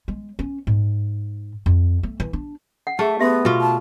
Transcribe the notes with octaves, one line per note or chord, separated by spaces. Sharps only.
G#3
C#4
G#2
F2
A3
E3
D4
F#5
A3 G#4 E5 A5
B3 G4 E5 C6
B2 F4
A5